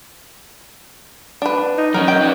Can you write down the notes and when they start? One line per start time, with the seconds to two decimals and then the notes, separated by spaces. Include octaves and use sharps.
1.42 D4 B4
1.78 D#4
1.94 F#3 C#4 A#4 C#5
2.08 G5
2.21 B4 D5